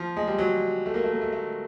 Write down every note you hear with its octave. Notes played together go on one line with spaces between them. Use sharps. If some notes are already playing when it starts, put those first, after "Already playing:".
Already playing: F3
G#3
G3
F#3
A3
A#3
A3
A#3
A3
A3